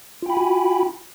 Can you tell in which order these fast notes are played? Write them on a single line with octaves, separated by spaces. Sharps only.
F4 G5 B5 G#5 F#4